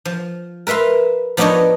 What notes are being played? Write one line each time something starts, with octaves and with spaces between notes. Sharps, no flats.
F3
A#4 B4 E5 F5 C6
F3 B3 D4 D#4 C#5 D#5